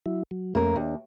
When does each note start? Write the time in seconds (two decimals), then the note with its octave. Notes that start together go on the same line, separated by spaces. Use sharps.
0.06 F#3 E4
0.31 F#3
0.55 F2 A3 A#3 C#4 A#4
0.76 D#2 D4